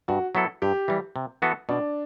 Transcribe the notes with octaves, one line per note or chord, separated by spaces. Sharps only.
G2 F#4
F#3 B3 E4 A4
G2 G4
E3 G3
C3
E3 B3 F#4 A4
B2 D4